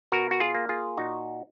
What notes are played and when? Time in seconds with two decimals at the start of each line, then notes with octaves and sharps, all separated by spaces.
0.12 B2 F#4 A#4
0.31 F#4
0.40 F4 G#4
0.55 A#3
0.69 F4 G#4
0.97 A#2 D#4 F#4